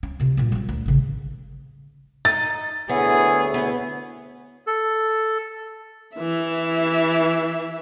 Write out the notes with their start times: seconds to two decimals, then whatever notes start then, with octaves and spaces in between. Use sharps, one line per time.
0.03 C#4
0.20 C3 F4
0.37 G2 A#2
0.52 F#3 C4
0.69 D2
0.86 A1 C#3
2.25 D#4 A6
2.90 D2 B3 E4 G#4 C#5
3.54 B3
4.67 A4
6.16 E3 E5